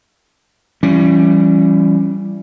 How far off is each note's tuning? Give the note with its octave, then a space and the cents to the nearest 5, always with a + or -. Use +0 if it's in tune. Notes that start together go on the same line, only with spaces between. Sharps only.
E3 +40 G3 +0 C#4 +0